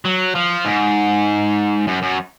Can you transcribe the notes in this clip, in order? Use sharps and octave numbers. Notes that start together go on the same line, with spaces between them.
F#3
F3
G#2
F#2
F#2